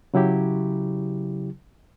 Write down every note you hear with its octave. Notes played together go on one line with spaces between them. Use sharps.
C#3 F#3 E4 G4